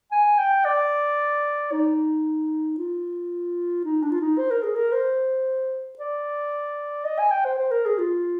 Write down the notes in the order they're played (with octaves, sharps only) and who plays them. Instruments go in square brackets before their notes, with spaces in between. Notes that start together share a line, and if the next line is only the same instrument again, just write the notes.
[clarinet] G#5
G5
D5
D#4
F4
D#4
D4
F4
D#4
C5
A#4
G#4
A#4
C5
D5
D#5
G#5
G5
C5
C5
A#4
G#4
F4